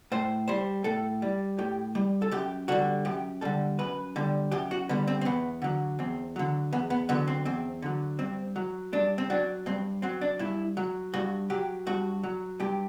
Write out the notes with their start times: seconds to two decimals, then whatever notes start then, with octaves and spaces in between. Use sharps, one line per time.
0.12 A2 C5
0.48 G3 C5
0.84 A2 A4
1.22 G3
1.58 A2 G4
1.95 G3
2.22 A4
2.31 F#2 G4
2.68 D3 G3 F#4
3.05 F#2 G4
3.41 D3 G3 A4
3.79 F#2 B4
4.16 D3 G3
4.51 F#2 G4
4.71 F#4
4.89 D3 G3 B3
5.08 C4
5.21 C4
5.25 E2 B3
5.62 D3 F#3
5.99 E2 C4
6.36 D3 F#3
6.73 E2 B3
6.90 B3
7.09 D3 F#3 B3
7.28 C4
7.45 E2 C4
7.82 D3 F#3
8.19 G2 C4
8.56 F#3
8.93 G2 D4
9.18 C4
9.30 F#3 D4
9.66 G2 C4
10.02 F#3 C4
10.21 D4
10.39 G2 E4
10.77 F#3
11.14 G2 F#4
11.50 F#3 G4
11.87 G2 F#4
12.23 F#3
12.60 G2 G4